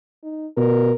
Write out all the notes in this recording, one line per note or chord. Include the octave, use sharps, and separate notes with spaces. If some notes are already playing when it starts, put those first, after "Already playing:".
D#4
B2 A#4